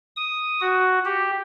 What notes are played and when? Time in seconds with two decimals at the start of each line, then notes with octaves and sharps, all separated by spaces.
0.17 D#6
0.61 F#4
1.05 G4